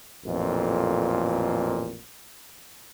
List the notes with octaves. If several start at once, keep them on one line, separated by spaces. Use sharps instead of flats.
A1 F2 A#2